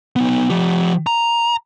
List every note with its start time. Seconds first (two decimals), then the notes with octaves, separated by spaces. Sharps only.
0.16 B3 D#4
0.50 F3 G4
1.07 A#5